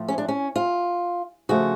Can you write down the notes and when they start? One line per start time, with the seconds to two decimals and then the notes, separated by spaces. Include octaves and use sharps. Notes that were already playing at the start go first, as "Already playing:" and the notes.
Already playing: A2 F3 A3
0.08 C#4
0.18 D4
0.28 C#4
0.56 F4
1.49 C#3 F3 A3 F#4